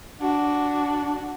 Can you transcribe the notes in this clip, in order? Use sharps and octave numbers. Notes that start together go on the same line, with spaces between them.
D4 F#4